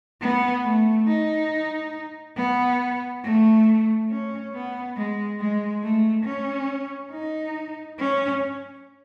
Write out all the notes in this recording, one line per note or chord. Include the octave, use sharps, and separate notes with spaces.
B3
A3
D#4
B3
A3
C#4
B3
G#3
G#3
A3
C#4
D#4
C#4